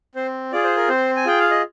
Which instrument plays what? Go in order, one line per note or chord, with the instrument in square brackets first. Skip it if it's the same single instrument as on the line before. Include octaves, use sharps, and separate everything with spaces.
[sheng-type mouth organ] C4 C5
F4 G#4 D5
C5
A#4
C4 C5
G#5
F4 G#4 G5
F5
D#5